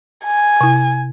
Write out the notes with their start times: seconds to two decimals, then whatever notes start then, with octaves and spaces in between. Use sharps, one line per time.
0.25 G#5
0.61 C3 E4